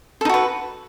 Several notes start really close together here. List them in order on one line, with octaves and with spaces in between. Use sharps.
A4 D#4 F#4 B4